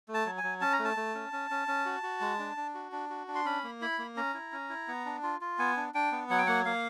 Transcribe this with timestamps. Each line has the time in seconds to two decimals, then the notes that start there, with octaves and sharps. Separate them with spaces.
0.08 A3
0.14 A5
0.26 F#3
0.38 G#5
0.43 F#3
0.61 C#4 A5
0.73 A#5
0.79 A3
0.84 A5
0.97 A3
1.15 C#4
1.33 C#4
1.50 C#4
1.68 C#4
1.86 F#4
2.03 F#4
2.21 G#3
2.39 D4
2.57 D4
2.75 F#4
2.92 D4
3.10 F#4
3.28 D4
3.35 C6
3.45 C#4 B5
3.64 A#3
3.81 E4 B5
3.99 A#3
4.17 C#4 A#5
4.34 E4
4.52 C#4
4.70 E4
4.88 B3
5.06 D4
5.23 F4
5.41 F4
5.59 B3 G#5
5.77 D4
5.94 D4 G5
6.12 B3
6.30 F#3 F#5
6.38 G5
6.47 A#3 F#5
6.65 A#3 F5